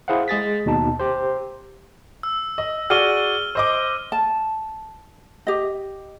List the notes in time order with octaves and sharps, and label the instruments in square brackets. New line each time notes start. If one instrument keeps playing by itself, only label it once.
[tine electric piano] E4 G#4 C5 F5 F#5
G#3 G#4 A6 B6
D#2 B2 D#4 A5
G4 C5
[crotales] E6
[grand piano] D#5
[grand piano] F#4 G#4 D5 [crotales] F6 D#7 G7
[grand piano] C5 D#5 D6
[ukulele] A5
G4 D#5